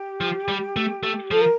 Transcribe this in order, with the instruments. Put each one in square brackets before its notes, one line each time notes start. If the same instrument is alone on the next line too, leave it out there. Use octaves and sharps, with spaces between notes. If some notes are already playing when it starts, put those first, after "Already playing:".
Already playing: [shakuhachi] G4
[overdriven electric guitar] F3
G3
A3
A3
[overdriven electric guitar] F3 [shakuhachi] A4
[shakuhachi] A#4